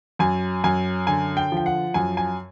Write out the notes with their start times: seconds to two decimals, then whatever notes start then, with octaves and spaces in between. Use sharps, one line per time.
0.19 F#2 G#5
0.64 F#2 G#5
1.07 D3 G#5
1.37 G5
1.52 F3
1.57 G5
1.66 F#5
1.94 F#2 G#5
2.17 G#5